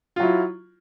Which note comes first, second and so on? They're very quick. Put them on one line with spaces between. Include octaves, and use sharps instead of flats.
F4 F#3 E4